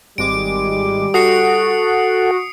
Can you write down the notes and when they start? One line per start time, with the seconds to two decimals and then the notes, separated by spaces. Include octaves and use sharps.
0.18 G#1 G3 G#3 D6 D7
1.14 F#4 A4 F#5 D#6 C7 C#7